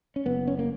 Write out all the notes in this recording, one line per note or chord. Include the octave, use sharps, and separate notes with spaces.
C#4
F#1 B3
C#4
A#3